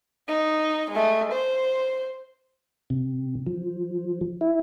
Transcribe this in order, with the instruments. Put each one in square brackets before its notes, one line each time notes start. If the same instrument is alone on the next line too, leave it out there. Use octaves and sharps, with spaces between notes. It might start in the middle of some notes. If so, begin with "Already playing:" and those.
[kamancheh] D#4
G#3 A3
C5
[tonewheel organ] C3
F3
E4